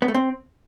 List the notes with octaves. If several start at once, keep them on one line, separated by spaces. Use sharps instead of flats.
B3
A3
C4